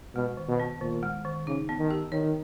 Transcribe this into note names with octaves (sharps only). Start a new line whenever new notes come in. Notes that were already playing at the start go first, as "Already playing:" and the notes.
B2 G#3
D#3
B2
B3
A#2 D#3
G#3
D#3
C#3 D#4
B3
D#3
G4
D#3 C#5